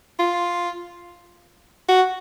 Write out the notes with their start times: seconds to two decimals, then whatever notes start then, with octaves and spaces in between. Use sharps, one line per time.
0.19 F4
1.88 F#4